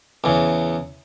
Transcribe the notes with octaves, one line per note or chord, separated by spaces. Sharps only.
E2 C#3